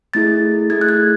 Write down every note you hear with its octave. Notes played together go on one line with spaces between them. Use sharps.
A3 E4 G#4 A6
A3 E4 G#4 G#6
F#6
G#6